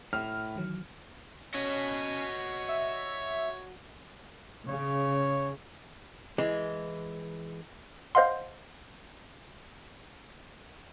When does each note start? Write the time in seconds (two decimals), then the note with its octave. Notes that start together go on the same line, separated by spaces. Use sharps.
0.13 A2 F6
0.56 D#3 E3 F#3
1.54 C#4 F#4 C#5 D#5
2.68 E5
4.68 C#3 C#5
6.38 E3 G#3
8.15 C5 D#5 F5 F#5 C6